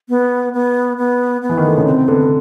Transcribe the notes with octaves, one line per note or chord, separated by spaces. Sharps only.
B3
B3
B3
B3
E3
D#3
D3
C#3
C3 C4
D3 B3